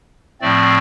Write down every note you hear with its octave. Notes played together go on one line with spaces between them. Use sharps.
A2 F3 A3 C4 D5